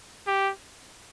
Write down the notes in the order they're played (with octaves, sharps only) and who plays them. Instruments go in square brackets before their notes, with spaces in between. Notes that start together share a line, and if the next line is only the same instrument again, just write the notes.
[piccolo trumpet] G4